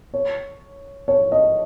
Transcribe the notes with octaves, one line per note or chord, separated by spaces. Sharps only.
C#5
C#5
D#5